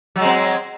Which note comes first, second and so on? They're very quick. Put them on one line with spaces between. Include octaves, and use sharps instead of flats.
F#3 G#3 C4